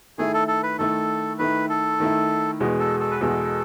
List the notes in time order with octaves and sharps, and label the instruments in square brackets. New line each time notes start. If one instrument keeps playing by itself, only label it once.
[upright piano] D#3 A3 E4 [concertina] G#4
[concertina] A4
A4
B4
[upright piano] D#3 A3 E4 [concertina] A4
[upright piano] D#3 A3 E4 [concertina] B4
[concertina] A4
[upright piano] D#3 A3 E4
E2 B2 G#3
[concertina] A4
A4
B4
[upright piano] E2 B2 G#3 [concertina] A4